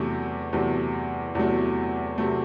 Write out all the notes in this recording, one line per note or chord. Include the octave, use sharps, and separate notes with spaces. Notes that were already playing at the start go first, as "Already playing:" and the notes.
Already playing: E2 C3 F#3 A3
E2 C3 F#3 A3
E2 C3 F#3 A3
C3 F#3 A3